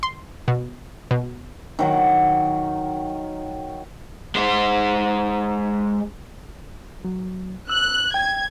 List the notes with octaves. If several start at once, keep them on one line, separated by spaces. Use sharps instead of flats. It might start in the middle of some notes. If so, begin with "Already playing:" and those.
C6
B2
B2
D#3 F#3 F#5
G#3 C5
F#3
E6 F#6
G5 G#6